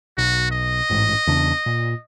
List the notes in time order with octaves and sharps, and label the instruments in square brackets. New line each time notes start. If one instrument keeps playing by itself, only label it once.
[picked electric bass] B1 [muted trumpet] F#4
[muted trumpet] D#5
[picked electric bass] A1 G#2
E2 C#3 D4
A#2